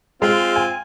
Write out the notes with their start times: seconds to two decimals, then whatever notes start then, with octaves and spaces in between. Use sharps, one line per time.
0.22 G#3 C4 F4
0.56 G#5